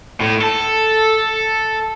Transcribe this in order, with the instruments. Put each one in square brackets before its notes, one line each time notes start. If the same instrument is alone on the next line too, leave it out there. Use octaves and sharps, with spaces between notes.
[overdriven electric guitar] A2
A4